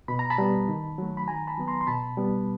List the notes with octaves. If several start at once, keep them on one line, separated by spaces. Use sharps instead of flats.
B2 B5
A#5
A5 B5
G3 B3
D#3
F#3 A3
B5
D#3 G#5 A#5
A5 B5
F#3 B3
A#5 C6
C6
B2 A5 B5
G3 B3